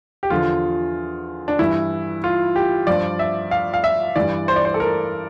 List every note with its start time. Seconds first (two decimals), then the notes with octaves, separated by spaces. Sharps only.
0.23 G4
0.30 E2 D3 F3 F4
1.48 D4
1.59 G2 E3 E4
2.24 F4
2.56 G4
2.87 G2 F3 D5
3.19 E5
3.51 F5
3.74 F5
3.84 E5
4.16 G2 E3 D5
4.48 C5
4.56 D5
4.65 C5
4.74 A4
4.80 A#4